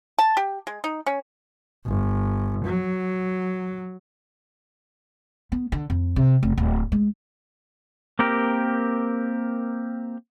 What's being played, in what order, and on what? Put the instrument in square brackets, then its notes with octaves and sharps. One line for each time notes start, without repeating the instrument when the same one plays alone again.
[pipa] A5
G4
G#3
D#4
C#4
[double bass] G1
F#3
[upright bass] B3
D3
F2
C3
F1
D1
G#3
[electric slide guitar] A#3 C4 G4 A#4